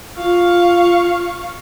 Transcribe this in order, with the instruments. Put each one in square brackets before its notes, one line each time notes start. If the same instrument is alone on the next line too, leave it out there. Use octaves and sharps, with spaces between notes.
[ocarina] F4 [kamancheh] F5 C#6